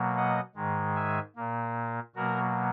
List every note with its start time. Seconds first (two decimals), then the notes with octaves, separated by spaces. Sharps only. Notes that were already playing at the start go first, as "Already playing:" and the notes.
Already playing: B2 F#3 A#3
0.16 D#5 F#5
0.55 G#2 D#3 G#3
0.95 E5 G#5
1.36 A#2 A#3
2.15 B2 F#3 A#3 F#4 A#4